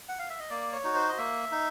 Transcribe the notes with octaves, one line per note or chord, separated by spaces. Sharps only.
F#5
F5
E5
D#5
A#3 D5
C#5
D#4 F#4
C5
D#5
A#3 E5
D#4